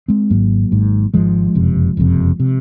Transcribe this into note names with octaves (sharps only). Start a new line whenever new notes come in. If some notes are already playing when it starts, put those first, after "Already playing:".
G#3 C4
G#1 G#2 F#3 A#3
G#1 G#2
G#1 G#2 F3 G#3
F#1 F2 C3
F#1 F2 C3
C3